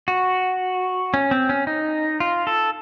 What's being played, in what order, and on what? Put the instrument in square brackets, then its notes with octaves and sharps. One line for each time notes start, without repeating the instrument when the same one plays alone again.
[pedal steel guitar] F#4
C#4
C4
C#4
D#4
F4
A4